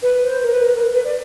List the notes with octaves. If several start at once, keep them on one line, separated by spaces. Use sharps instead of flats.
B4
C5
A#4
B4
A#4
A#4
B4
D5